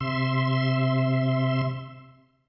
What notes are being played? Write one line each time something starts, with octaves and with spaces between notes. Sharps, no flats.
C3 E5 C6